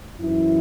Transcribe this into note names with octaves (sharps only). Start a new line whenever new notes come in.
F#2 E3 E4